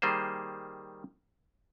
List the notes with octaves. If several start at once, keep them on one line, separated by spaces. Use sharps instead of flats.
D#3 G3 A#3 G#4 C5